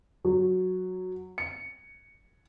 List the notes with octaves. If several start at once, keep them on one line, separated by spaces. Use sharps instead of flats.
F#3
C#7